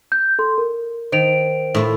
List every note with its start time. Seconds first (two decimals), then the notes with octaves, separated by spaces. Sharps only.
0.12 G6
0.39 A4 C6
0.58 A#4
1.12 D#3 C5 D7 F7
1.74 A2 E4 F4